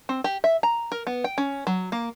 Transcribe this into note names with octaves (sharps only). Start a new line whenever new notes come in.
C4
G4
E5
A#5
A#4
B3
G5
C#4
F#3
A#3